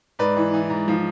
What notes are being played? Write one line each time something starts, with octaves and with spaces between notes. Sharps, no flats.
G#2 B4 D5
E3
E3
G#2
F3